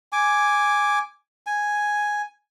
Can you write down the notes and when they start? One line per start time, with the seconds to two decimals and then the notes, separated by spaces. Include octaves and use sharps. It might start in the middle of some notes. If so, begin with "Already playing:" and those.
0.12 G#5 D6
1.47 G#5